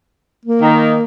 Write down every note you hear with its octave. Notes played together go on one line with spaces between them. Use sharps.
A#3
D#3